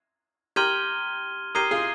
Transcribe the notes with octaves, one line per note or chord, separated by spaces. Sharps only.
G4 A#4 C6 F6 G#6 D#7 G7
G4 A#4 D#6 G#6 C7 D#7 G7
F4 G#4